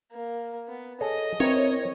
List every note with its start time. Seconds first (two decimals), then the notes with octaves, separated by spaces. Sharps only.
0.12 A#3
0.68 B3
1.01 G#4 A4 C#5 D#5
1.40 C4 E4 A#4 B4 C#5